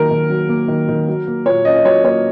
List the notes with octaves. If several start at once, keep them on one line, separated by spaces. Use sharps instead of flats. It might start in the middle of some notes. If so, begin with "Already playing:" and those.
Already playing: D#3 F#3 A#3 A#4
D#3
F#3
A#3
D#3
D#3
F#3
A#3
A#2 C#5
C#4 D#5
D#5
F#3 C#5
A#3 C#5